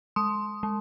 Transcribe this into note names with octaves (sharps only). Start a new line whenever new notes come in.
G#3 C6 D#6
G#3